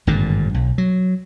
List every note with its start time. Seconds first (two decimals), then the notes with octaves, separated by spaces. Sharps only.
0.07 G#1 G2 A#2 D3
0.54 B1
0.78 F#3